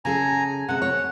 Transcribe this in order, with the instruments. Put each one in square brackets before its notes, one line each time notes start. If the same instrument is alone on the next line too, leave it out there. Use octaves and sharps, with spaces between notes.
[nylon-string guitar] C#3 G#4 A4 [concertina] G#5 A#5
[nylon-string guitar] C3 G#3 [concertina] F#5
[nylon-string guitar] C#5 [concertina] F#5